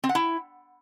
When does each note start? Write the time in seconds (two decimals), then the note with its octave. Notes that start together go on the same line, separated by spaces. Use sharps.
0.04 C4
0.09 F#5
0.15 E4